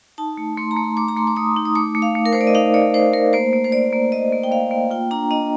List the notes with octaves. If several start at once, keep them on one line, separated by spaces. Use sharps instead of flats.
D#4 A5
A3
A3 C6
A#5
A3
C6
A3 D6
A#5
A3 C6
D6
A3 D#6
D#4
D#6
A3 D6
A3
F5
A3
A#4
A3 C5
D5
D#5
D#4 F5
A3 D5
D#4 C5
A3 A#4
A#3 C5
A#3
C5
A#3 D5
A#3
A#3 D#5
A#3
G5
A#3 F5
A#3
F4 G5
D4 A#5
D4 D#5